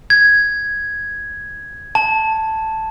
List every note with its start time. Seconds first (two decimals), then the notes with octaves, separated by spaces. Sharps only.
0.10 G#6
1.95 A5